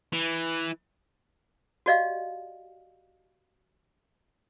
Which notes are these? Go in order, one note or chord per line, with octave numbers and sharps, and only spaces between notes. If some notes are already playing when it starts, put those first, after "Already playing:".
E3
F#4 G4 D5 D#5 F5